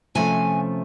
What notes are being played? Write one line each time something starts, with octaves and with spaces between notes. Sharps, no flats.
C3 F3 A3 C#4 G#5